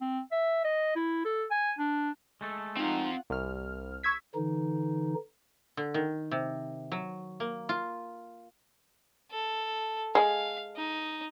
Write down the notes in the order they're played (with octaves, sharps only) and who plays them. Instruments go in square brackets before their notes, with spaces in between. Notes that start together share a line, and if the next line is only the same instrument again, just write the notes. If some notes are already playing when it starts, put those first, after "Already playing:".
[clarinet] C4
E5
D#5
E4
A4
G#5
D4
[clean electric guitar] G#3 A3 A4
[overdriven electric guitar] C4 F5 [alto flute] D#4 [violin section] F4 F#5
[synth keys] C2 F6
C#6 E6 G#6 B6
[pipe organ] D3 E3 D#4
[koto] D3
D#3
C3
F#3
A#3
F4
[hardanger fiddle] A4
[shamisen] G#3 [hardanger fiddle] F5
[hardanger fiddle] D#4